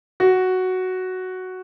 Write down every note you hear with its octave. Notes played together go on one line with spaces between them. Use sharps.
F#4